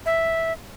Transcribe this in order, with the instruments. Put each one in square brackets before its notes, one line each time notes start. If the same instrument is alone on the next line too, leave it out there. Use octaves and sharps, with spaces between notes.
[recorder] E5